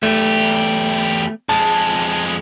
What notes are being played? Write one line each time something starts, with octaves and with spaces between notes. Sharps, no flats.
E2 A3 G4
F2 G#3 A5